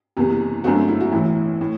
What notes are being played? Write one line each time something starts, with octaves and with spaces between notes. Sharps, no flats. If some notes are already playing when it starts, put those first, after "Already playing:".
F#1 E2 C3
G1 F#2 D3 A3 C4 F#4
E4
F#4
A1 A2 E3 E4
A2